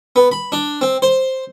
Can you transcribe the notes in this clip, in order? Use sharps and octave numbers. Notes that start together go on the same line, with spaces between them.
B3
B5
D4
C4
C5